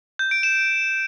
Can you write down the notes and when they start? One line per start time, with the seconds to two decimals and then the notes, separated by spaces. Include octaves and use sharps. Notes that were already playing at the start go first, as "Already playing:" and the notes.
0.19 G6
0.31 D7
0.43 E7